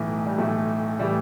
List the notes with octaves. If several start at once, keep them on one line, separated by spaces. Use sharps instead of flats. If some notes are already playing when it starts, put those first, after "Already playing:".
Already playing: B1 A2 E3
G3
B1 A2 E3 A3
A2 E3 G3